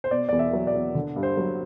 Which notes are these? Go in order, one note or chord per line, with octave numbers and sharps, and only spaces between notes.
C5
B2 D5
E2 D5
E5
F#3
D5
E2
D3
G2
C5
F#3